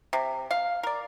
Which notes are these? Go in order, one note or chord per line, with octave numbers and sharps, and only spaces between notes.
C3
F5
A#4 D5